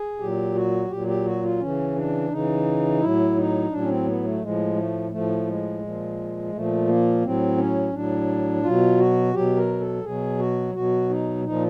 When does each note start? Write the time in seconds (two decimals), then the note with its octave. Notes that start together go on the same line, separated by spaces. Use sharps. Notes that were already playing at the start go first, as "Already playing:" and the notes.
Already playing: G#4
0.20 A#2 F#3 G4
0.55 F#4
0.89 A#2 F#3 G4
1.07 G4
1.25 F#4
1.43 F4
1.60 C#3 E3 C#4
1.96 D4
2.30 C#3 E3 D#4
3.01 A2 F#3 E4
3.37 D#4
3.71 A2 F#3 D4
3.81 C#4
3.88 C4
4.06 B3
4.24 A3
4.42 A2 F3 G#3
4.76 A3
5.11 A2 F3 A3
5.46 G#3
5.82 A#2 F3
6.53 A#2 F3 A3
6.88 A#3
7.22 A2 F#3 C4
7.58 C#4
7.93 A2 F#3 D4
8.63 B2 F#3 F4
8.98 F#4
9.34 B2 F#3 G4
9.57 A#4
9.80 A4
10.03 B2 F#3 G#4
10.39 F#4
10.74 B2 F#3 F#4
11.10 D#4
11.44 A#2 F3 D#4